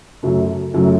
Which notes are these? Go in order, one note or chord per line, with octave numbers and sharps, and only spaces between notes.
F#2 C#3 F#3 A3
F#2 C#3 F#3 A3